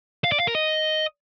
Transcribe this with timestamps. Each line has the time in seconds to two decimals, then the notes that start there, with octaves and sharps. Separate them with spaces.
0.24 F5
0.32 D5
0.40 F5
0.47 A#4
0.55 D#5